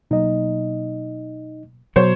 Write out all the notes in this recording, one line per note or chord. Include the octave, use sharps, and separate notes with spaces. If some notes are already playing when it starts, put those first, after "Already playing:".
B2 F#3 A#3 D#4 D#5
B2 F#3 C5 C#5